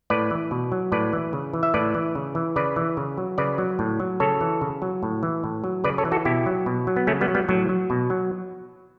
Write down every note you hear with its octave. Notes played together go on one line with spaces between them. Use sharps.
A2 B4 D5
E3
B2
F#3
A2 B4 D5
E3
C#3
E3
E5
A2 B4 D5
E3
C#3
E3
C#3 B4 D5
E3
C#3
F#3
C#3 B4 D5
F#3
A2
F#3
C#3 A4 C#5
E3
C#3
F#3
A2
E3
A2
F#3
C#3 B4 D5
A4 C#5
E3
F#4 A4
B2 E4 G4
F#3
B2
F#3
B3
C#3 A3 C#4
G3 B3
F#3
G3 B3
A2 F#3
F#3
B2
F#3